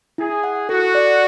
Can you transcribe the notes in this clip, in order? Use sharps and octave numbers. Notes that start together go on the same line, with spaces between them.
E4 G#4
F#5
F#4 A4
D5